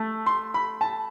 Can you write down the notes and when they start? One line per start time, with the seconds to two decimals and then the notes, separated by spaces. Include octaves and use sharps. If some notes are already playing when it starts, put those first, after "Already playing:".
Already playing: A3
0.26 C6
0.54 B5
0.81 A5